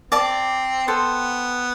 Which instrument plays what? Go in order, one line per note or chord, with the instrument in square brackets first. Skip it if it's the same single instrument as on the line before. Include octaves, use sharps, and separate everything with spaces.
[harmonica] C4 [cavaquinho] D5 A5 D6
[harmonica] B3 [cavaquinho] A4 C5 G5